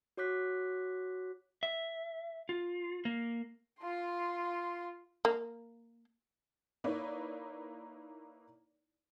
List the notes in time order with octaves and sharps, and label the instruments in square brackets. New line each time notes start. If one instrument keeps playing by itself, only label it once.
[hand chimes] F#4 C#5 D6 F#6 B6
[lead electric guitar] E5
F4
A#3
[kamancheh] F4 C6
[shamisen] A#3
[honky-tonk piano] A#3 D#4 E4 B4 C#5 D5